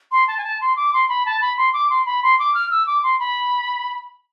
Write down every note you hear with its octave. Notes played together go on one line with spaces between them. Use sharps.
C6
A5
G#5
A5
C6
D6
C6
B5
A5
B5
C6
D6
C6
B5
C6
D6
F6
E6
D6
C6
B5